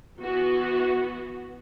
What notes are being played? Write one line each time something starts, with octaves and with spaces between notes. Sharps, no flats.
E3 B3 F#4